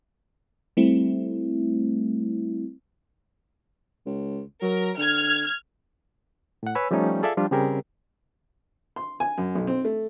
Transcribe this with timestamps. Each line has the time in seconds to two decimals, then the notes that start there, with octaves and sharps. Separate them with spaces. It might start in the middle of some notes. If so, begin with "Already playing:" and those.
0.77 G3 A3 C4 E4
4.06 C#2
4.62 F#3 A#4
4.98 D3 F6 G#6
6.63 A2 F#5
6.75 B4 C#5 G#5 B5 E6
6.91 F3 G3 A3 C#4 D#4
7.22 F4 G#4 A4 D5 E5 F5
7.37 F3 G3 D4 F4
7.51 C#3 G3 C4 G4 G#4 A#4
8.96 C6
9.20 G#5
9.38 F#2
9.55 B1
9.67 C4
9.85 A3